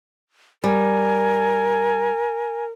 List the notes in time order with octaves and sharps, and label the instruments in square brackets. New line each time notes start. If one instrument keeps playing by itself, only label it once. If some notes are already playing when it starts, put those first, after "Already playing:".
[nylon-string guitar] G3 [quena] A#4 [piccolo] G#5